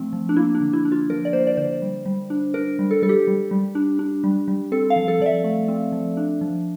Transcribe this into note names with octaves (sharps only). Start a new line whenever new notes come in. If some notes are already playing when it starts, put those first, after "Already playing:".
Already playing: F3 A3 C4
F3
D4
A#3 E4
D4
D3
E4
D4
F4
F3 A#4
D5
A#3 C5
D5
D3 C5
G3
G3
D4
D4 A#4
G3
A4
G3 A4
G4
G3
G3
D4
D4
G3
G3
C4 A4
F5
F3
A4
F3 D5
E5
A3
C4
F3
D4
F3